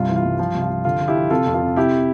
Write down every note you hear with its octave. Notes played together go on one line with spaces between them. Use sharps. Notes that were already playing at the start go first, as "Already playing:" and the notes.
Already playing: C2 G2 F4
E3
F4
G2
F3 F4
C2
F4
F3
D3 F4
D3
E4 G4
F3
C3 F4 A4
F2
F4 A4
C3
C3 E4 G4